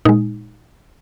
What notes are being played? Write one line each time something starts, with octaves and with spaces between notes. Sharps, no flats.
A#2 G#3 D#4